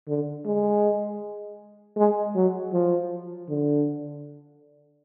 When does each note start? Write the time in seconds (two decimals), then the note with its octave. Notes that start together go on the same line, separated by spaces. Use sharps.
0.08 D3
0.46 G#3
1.97 G#3
2.35 F#3
2.73 F3
3.49 D3